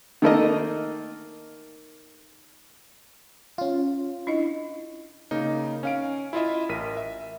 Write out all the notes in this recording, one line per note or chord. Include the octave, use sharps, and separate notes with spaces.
D#3 A3 A#3 D#5
C#4 F4
D4 E4 D#5
C#3 A#3 D#4
C#4 F5 D7
E4 F4 D#5 E5
A1 A#4 B6 D#7
E5